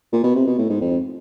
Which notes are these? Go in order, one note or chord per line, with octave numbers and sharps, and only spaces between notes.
A#2
B2
C3
B2
A2
G#2
F2